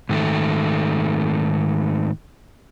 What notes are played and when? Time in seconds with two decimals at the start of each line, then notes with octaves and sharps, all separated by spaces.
0.09 G#2 D#3 A3